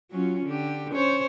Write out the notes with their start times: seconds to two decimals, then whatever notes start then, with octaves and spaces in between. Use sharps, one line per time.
0.11 F#3 C#4 F4
0.46 D3 G4
0.93 C#4 C5 C#5